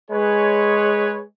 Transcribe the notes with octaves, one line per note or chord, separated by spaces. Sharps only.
G#3 G#4 B4 C#5